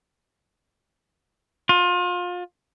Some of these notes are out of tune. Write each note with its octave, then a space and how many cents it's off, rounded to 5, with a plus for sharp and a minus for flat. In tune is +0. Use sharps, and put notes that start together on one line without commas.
F4 +30